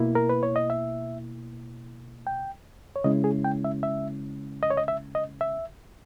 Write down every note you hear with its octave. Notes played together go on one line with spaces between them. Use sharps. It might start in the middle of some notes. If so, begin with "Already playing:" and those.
Already playing: B2 A#3 E4
A#4
B4
C#5
D#5
E5
G5
C#5
C#3 G#3 C#4 E4 D#5
G#4
G5
E5
E5
D#5
C#5
D#5
E5
D#5
E5